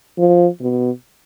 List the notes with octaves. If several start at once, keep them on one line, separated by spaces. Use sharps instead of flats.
F3
B2